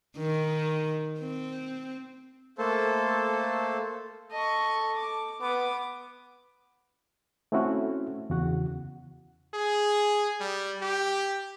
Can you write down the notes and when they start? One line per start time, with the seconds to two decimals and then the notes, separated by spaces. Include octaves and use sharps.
0.17 D#3
1.20 C4
2.58 A3 A#3 A4 C5
4.31 A4 D#5 C#6
4.96 D6
5.41 B3 D6 D#6
7.52 A3 C4 C#4 E4 F#4
8.30 E2 C#3 F#4 F#5
9.54 G#4
10.41 G3
10.82 G4